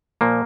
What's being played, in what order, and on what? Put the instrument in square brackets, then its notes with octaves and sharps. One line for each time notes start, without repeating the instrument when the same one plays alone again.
[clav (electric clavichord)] A#2 F3 A#3